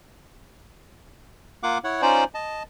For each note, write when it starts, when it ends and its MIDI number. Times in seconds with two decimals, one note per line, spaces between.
1.63 1.78 58
1.63 1.78 65
1.63 1.78 78
1.63 1.78 86
1.84 2.02 64
1.84 2.02 73
1.84 2.02 78
2.02 2.24 61
2.02 2.24 63
2.02 2.24 65
2.02 2.24 72
2.02 2.24 74
2.34 2.63 75
2.34 2.63 81